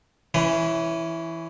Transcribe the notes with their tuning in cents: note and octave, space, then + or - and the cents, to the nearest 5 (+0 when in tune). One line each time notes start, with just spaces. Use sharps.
E3 +0 C#4 +0 B4 +40